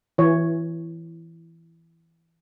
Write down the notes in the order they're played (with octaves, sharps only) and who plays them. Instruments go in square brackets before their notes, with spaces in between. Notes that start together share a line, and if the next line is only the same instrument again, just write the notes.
[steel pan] E3 C#5